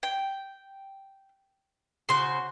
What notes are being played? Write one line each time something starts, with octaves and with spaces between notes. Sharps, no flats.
G5
C#3 F#4 C5 C6